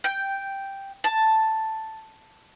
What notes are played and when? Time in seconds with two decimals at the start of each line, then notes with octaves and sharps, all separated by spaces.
0.04 G5
1.04 A5